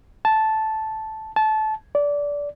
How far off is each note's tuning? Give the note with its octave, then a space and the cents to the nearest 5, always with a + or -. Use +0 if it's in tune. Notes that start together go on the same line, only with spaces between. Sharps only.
A5 -5
A5 -20
D5 -20